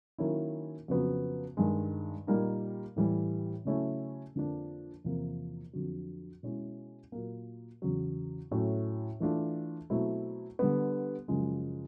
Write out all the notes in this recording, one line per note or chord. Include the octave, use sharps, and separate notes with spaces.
D#3 F#3 A#3 C#4 E4
F2 C#3 F#3 B3
G2 D#3 G#3
A#2 G3 A#3 D#4
A2 E3 G3
C#3 F#3 A3 C#4 E4
F2 D3 F3 A#3 D4
E2 C3 F3 A#3
F2 D3 F#3
B2 G#3 C#4 E4
A#2 F#3 A#3
E2 C#3 F#3
A2 F#3 A3 C#4
E3 A3 D4 F4
B2 F#3 A3 C4 E4
D3 G3 B3
F#2 C#3 F3 G#3